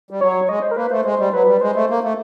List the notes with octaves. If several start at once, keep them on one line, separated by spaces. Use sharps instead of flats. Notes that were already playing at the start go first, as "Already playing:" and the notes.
G3
F#3 C#5
G#3 D#5
C5
A#4
A#3 B4
A3 C5
G#3 C5
G3
F#3 B4
G3
G#3 C5
A3
A#3
A3